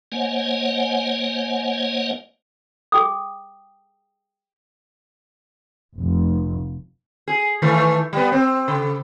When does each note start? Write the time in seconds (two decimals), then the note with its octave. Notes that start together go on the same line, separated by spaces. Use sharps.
0.12 A#3 C5 C#5 D#5 F#5 G#5
2.92 G#4 G5 D#6
5.99 F1
7.28 G#4
7.62 D#3 E3 A3
8.13 G3 B3
8.32 C4
8.68 C#3